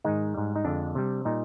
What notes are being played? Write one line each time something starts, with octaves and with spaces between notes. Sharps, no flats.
G#2 D#3 G#3 D#4
G#2 G3
D#4
F2 D3 G#3 D4
C3 G3
A#2 G3 D#4